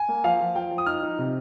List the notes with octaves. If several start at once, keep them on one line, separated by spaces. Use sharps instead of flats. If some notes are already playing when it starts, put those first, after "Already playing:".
Already playing: G#5
A#3
F3 F5
F3
F3 G5
F3
D#6
D#4 F6
D#4
C3